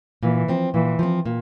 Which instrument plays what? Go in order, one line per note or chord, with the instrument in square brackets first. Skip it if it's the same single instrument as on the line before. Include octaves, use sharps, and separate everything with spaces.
[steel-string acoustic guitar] A#2 [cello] E3
[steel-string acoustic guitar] F3 C4
[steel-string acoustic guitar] A#2 [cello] E3
[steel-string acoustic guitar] F3 C4
A#2